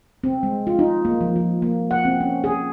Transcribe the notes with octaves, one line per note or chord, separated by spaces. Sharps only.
C4
G#3
F4
D#4
A#3
F3
F3
A#3
F#5
C4
C#4
G#4